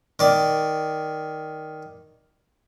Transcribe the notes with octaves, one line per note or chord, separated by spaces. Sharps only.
D#3 D5